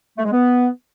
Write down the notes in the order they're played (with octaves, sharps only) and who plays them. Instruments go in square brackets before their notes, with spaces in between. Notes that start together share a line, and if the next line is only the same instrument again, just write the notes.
[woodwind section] A3
G#3
B3